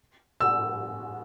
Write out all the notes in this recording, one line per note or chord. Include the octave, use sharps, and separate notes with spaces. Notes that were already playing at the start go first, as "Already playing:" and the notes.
E6